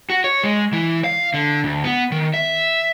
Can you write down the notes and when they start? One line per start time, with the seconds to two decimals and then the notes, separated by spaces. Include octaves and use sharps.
0.10 F#4
0.24 C#5
0.44 G#3
0.73 E3
1.04 F5
1.34 D3
1.64 D2
1.84 B3
2.12 D#3
2.34 E5